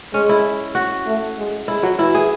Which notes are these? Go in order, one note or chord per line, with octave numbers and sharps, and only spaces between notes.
G#3 C#4
E4
F#4
A3
G#3
G#3 E4
F#3
E3 E4
G#4